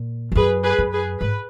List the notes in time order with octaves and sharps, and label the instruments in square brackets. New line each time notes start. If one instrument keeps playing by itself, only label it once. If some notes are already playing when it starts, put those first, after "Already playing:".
Already playing: [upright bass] A#2
E2
[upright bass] F#2 [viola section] G#4 B4
[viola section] G#4 B4
[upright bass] F#2
[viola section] G#4 B4
[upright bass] G#2 [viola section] B4